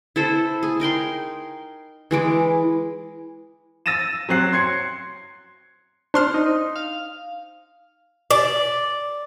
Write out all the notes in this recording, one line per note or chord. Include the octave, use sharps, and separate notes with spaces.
E4 A4 C5
G#4
D#4 A#4 G5 C6
E3 G#3 D6
E6 A6 A#6 D#7 E7
F#3 C4 F#6 C7
C6 G#6 C7 C#7
D4 C5 C6 F6
D#4
D#4
F5
D5